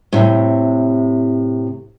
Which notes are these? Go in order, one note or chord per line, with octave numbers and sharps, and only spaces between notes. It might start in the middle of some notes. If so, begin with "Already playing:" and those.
A2 C3